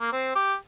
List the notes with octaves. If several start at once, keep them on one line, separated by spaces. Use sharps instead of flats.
A#3
C4
G4